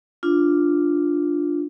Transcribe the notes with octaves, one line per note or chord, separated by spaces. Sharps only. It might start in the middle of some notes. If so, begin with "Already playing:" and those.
D4 F4